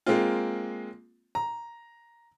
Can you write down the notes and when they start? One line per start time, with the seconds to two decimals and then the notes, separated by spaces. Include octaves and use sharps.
0.06 G#3 A#3 C4 F4
1.35 A#5